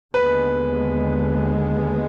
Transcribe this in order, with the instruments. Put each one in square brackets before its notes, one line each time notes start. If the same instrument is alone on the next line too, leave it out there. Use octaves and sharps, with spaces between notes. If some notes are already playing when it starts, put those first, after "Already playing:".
[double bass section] D#2 D3 G#3 B3 [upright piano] B4